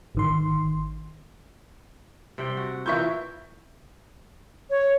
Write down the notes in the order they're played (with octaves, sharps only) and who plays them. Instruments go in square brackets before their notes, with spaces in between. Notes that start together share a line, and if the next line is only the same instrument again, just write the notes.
[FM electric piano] G#1 D#3 C6
[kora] C3 G3 G5
F#4
[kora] A#2 E3 A#3 [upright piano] E5 C#6 G6
[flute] C#5